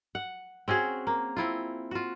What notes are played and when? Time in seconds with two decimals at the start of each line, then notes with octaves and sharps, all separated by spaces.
0.15 F#5
0.68 C4 C#4 F#4 G#4
1.07 A#3
1.37 C4 E4 F4
1.91 F4 F#4